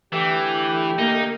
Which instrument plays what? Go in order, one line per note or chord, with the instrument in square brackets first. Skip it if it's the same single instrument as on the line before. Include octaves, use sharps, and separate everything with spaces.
[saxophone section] D3 A3 G4 [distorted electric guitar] E3
[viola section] A#3 [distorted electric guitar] D#4